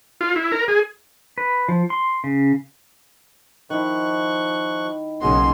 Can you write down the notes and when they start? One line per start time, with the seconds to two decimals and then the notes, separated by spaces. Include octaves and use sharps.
0.21 F4
0.36 E4
0.52 A#4
0.68 G#4
1.38 B4
1.68 F3
1.90 C6
2.24 C#3
3.70 D#3 F3 E4 C#6 F#6
5.22 B1 C#3 A#3 G#4 D#5 F#5 C6